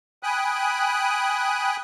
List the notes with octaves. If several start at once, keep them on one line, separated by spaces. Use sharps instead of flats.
G5 G#5 B5 D#6 F#6